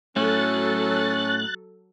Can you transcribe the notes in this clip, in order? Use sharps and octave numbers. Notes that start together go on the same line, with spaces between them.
A2 F#3 A3 C#4 A4 F#6 A6